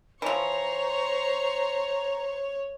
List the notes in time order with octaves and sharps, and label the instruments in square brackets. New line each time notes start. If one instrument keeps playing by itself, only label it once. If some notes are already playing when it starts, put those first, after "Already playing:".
[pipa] E3 F3 [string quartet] C5 C#6 [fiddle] C#5 [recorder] A#5